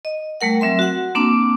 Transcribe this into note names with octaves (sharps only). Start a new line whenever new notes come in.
D#5
G3 A3 A#4 F#5
F#3 C4 E5 C6
F#4 F#5
A#3 C4 D4 A5 D6